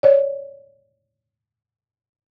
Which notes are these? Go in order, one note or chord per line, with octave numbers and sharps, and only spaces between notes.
C#5 D5